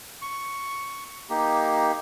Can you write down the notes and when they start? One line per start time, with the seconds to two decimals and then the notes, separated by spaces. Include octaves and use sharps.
0.22 C#6
1.30 A#3 D#4 G4